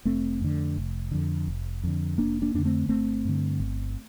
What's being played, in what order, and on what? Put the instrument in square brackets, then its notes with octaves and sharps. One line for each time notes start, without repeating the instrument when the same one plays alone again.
[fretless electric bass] F1 A3 C4
F2 D3
F1
F2 D3
F1
F2 D3
F1 A#3 D4
A#3 D4
F2 D3 D4
A3 C4
G1 A3 C4
G2 D3
G1